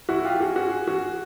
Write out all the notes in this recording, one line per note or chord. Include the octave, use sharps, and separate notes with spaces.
E4 F#4
F4 G4
F#4 G#4
F#4 G#4
F#4 G#4